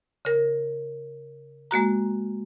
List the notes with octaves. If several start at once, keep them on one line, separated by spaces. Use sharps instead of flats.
C#3 A#4
G#3 A#3 F#4 A#5